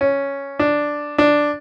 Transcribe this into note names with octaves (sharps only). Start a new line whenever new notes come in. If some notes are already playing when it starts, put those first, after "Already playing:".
C#4
D4
D4